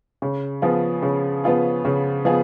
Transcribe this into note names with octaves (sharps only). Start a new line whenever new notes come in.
C#3
F3 B3 F4 G#4
C#3
F3 B3 F4 G#4
C#3
F3 B3 F4 G#4